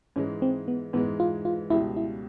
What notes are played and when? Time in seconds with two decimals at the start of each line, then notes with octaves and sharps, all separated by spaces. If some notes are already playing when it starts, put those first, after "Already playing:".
0.16 G#2 E3 G#3 C#4
0.42 C4
0.68 B3
0.93 G#2 E3 G#3 B3
1.20 F4
1.45 F4
1.70 C#2 B2 G3 E4
1.97 E4